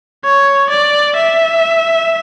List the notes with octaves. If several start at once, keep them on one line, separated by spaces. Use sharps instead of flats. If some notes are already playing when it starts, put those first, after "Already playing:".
C#5
D5
E5